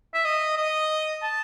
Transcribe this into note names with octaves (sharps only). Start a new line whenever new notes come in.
E5
D#5
D#5
A5